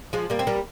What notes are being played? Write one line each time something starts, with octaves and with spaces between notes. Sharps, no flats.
F3 G#3
G3 A#3
C4
G3 A#3